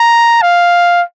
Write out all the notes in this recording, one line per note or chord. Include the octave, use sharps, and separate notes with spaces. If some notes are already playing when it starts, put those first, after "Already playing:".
Already playing: A#5
F5